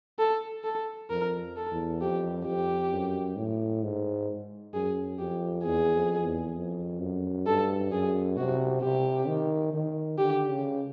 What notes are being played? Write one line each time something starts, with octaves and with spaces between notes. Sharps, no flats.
A4
A4
F2 A#4
A4
E2
F2 G4
F2 G4
F#2
A2
G#2
F#2 G#4
F2 G4
E2 G#4
F2
E2
F2
F#2
G2 A4
F#2 G#4
C3 F#4
C3 G4
D#3
D#3
D3 G4
C#3